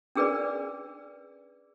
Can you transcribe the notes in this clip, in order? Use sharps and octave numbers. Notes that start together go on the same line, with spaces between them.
C#4 D4 G#4 A#4 B4 D5